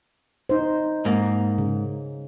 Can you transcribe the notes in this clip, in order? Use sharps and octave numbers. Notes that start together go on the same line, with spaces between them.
D#4 C5
G#2 A#3
C#3